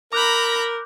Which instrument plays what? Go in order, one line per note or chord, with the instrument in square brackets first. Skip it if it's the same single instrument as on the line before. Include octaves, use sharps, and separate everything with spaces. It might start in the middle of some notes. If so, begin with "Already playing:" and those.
[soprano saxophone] A#4 [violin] A#5 B5 [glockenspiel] D6 F#6 G6